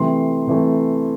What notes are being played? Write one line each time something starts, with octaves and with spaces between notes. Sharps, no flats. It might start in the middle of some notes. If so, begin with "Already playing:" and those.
Already playing: C3 E3 A3 C6
C3 E3 A3